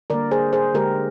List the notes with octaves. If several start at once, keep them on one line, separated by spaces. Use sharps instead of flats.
D3 G3 A#3 A#4 D5
G#4 C5
G#4 C5
D3 G#3 G4 A#4